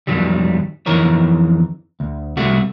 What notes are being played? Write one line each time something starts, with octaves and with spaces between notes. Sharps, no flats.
F2 D#3 F#3 G3
F2 D#3 E3 A#4 C#5
D2
C2 C3 A3 F#4